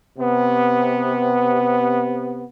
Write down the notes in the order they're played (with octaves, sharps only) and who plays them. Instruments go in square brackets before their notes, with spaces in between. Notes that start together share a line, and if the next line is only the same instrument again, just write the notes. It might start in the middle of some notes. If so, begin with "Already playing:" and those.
[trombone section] C3 B3